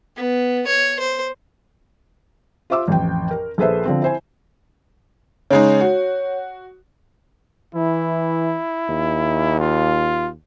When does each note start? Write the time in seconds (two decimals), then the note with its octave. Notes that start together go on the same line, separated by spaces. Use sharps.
0.16 B3
0.66 C#5
0.99 C5
2.70 F4 C5 E5 D6 E6
2.88 A1 F2 G5
3.31 A#4
3.58 A#1 G#4 A4 B4 C5 E5
3.85 D3 F3 C4
4.02 E4 C5 G#5
5.51 C#3 G#3 D#4 C#5
5.81 F#4
7.74 E3 E4
8.89 D#2
9.60 F4